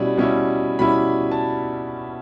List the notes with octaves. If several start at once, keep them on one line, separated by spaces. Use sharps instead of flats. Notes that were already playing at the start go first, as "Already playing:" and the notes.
Already playing: B2 G3 C#4 E4
B2 G3 C#4 E4
B2 G3 C#4 E4 B5
A5